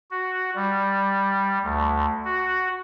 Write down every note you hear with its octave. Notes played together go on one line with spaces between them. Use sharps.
F#4
G3
D2
F#4